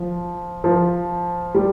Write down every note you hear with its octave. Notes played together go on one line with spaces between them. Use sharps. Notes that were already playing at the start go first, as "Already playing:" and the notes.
Already playing: F3
F3
G3